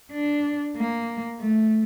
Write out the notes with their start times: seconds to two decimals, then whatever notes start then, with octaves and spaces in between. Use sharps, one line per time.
0.12 D4
0.76 A#3
1.40 A3